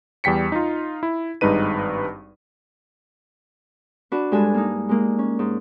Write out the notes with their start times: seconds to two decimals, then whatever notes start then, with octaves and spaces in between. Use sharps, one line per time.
0.24 E2 G3 G5 B6 C#7
0.52 D#4 F4
1.03 E4
1.41 G#1 G2 G#3 D#4 B4 D#7
4.12 D4 F#4 B4
4.32 G2 G#3 A4 G#5
4.54 A#3 D#4
4.89 G#3 A#3
5.19 C#4
5.39 G#2